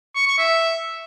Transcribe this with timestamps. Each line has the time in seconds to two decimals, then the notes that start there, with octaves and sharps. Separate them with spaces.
0.16 C#6
0.27 C#6
0.38 E5